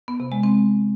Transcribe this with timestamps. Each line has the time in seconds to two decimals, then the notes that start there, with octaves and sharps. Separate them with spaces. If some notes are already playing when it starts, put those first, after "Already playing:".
0.08 B3
0.20 C3
0.32 G#3
0.43 C4